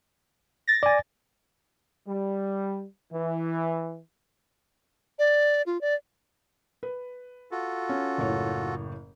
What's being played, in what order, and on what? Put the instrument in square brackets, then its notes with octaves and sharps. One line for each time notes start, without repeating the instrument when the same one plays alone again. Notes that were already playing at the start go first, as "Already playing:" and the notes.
[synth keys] A6 A#6
[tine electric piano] D5 G#5
[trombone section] G3
E3
[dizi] D5
F4
D5
[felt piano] B4
[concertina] F4 F#4 A4
[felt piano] C#4
F#1 A2 C#5